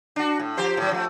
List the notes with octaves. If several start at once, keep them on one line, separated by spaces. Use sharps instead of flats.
D4 F#4
A2
F3 G4 C5
A2 F#3
F3 A3